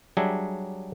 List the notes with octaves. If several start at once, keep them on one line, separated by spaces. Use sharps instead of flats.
F#3 G3 D4 G#4 E5